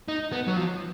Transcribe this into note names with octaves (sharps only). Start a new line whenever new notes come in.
D#4
B3
F#3
F3